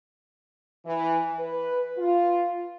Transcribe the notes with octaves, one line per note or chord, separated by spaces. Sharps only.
E3
B4
F4